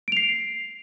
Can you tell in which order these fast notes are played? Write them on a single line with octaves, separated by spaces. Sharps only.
D7 F7 C7